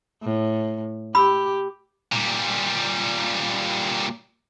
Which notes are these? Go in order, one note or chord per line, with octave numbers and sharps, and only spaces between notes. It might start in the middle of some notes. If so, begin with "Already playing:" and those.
A2
G4 B5 E6
A#2 G3